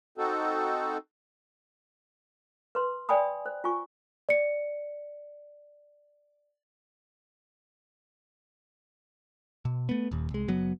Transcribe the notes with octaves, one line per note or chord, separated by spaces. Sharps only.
C4 D#4 F#4 A4
B4 C6
D5 G5 G#5 B5 D#6
C5
F4 G#5 C#6
D5 C#7
B2
A3 B3
D#1 D#2
C2 G#3
F#1 F#3 B3